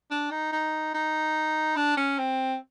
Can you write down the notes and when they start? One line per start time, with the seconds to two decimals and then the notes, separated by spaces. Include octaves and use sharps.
0.11 D4
0.31 D#4
0.52 D#4
0.94 D#4
1.76 D4
1.97 C#4
2.18 C4